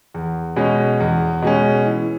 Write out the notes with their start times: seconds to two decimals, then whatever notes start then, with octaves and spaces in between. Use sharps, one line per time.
0.14 E2
0.56 B2 G#3 C#4
1.00 E2
1.42 B2 G#3 C#4
1.86 E3